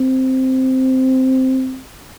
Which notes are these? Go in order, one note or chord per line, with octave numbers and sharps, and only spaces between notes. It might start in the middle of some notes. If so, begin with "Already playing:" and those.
Already playing: C4